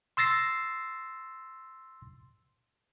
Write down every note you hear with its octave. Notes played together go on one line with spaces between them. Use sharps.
C6 E6 A6 A#6 C7